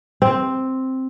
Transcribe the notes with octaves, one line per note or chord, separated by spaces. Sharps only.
C4